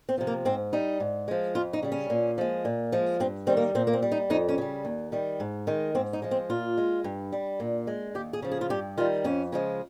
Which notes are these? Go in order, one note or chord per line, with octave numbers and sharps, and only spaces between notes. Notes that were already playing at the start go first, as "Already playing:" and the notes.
C4
C3 F3
A#3
G#2 C4
G3 D#4
G#2
F3 G#3
F2 F4
D#4
C#3 G3
C#4
A#2
F3 G#3
A#2
F3 G#3
G2 C4
D#3 G3 C4
A#3
A#2 C4
A#3
C4
G3
D#4
F2 D#4
C#4
C#3 G3
D#2
D#3 G3
G#2
D#3 G#3
G#2 C4
D#4
F3 G#3
C4
A#2 F4
G#3
G2
G3
A#2
G#3
D#2 G4
G#4
C#3 F3
G#4
F4
G2 G4
D#3 G3 F4
F2 C#4
C#3 F3 G#3